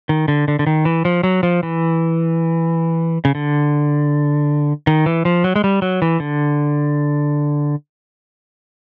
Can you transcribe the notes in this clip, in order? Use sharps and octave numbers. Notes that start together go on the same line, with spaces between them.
D#3
D3
D3
D3
D#3
E3
F3
F#3
F3
E3
C#3
D3
D#3
E3
F3
F#3
G#3
G3
F#3
E3
D3